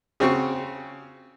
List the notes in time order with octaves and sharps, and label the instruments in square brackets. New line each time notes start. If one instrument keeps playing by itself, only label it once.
[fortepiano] C#3 C4 F#4 C#6